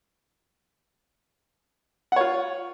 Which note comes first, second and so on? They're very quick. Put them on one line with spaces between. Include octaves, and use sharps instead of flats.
F#5 C#5 F4